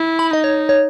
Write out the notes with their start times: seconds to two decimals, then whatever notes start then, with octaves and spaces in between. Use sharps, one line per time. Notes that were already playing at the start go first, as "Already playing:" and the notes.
Already playing: E4
0.19 B5
0.31 D#4 D#5
0.44 C#5
0.69 C#5